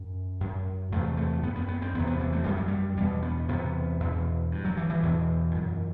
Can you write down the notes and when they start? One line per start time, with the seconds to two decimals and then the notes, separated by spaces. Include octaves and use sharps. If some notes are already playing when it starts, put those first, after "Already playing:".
Already playing: F#2
0.40 F#2
0.92 E2 C3 A3
1.17 A3
1.43 F#2 B3
1.56 B3
1.68 B3
1.82 C4
1.94 E2 B3
1.99 C3
2.07 B3
2.20 E3
2.32 A3
2.44 F#2 G3
2.57 F#3
2.68 G3
2.97 E2 B2 G3
3.22 B3
3.48 E2 C3 B3
4.00 E2 B2
4.51 G2
4.65 F#3
4.77 E3
4.90 E3
5.03 E2 B2
5.55 F#2